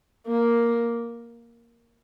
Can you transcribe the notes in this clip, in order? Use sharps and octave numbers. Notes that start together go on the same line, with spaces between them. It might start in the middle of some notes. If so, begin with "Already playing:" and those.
A#3